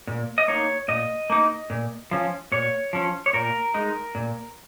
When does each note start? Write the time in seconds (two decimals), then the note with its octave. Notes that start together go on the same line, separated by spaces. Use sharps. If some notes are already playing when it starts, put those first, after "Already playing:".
0.07 A#2
0.38 D#5
0.48 A#3 D#4 C#5
0.88 A#2 D#5
1.30 A#3 D#4
1.70 A#2
2.11 F3 C#4
2.52 A#2 C#5
2.93 F3 C#4
3.26 C#5
3.33 A#2 A#4
3.74 G#3 D#4
4.15 A#2